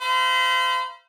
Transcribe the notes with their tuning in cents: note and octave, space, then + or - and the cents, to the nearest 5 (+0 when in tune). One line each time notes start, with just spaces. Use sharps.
C5 -35 F5 -35 B5 -45